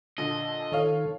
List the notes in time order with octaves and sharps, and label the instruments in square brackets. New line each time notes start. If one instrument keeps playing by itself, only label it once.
[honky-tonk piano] A#2 D3 [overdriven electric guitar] D#5 [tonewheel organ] A5
[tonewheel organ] D#3 [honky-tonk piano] F4 C#5 F5 [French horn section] A4